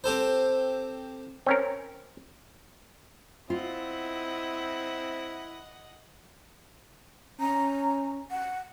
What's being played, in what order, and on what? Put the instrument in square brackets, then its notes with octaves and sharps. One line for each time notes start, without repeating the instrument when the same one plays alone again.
[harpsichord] C4 G4 A4 C5
[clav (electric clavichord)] C4 C#4 A#4
[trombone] C4 [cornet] E4 [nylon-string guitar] F4 [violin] D#5 F#5
[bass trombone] C#4 [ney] A#5
[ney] F#5